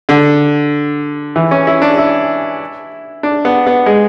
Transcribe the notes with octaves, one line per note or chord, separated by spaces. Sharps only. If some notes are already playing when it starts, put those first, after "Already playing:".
D3
E3
C#4
E4
D4
E4
D4
B3
B3
G#3